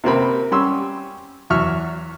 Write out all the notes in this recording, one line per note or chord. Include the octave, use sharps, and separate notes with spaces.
C3 A#3 C4 B5
G3 C#4 C6 E6
E2 F#3 E5 C#6 F6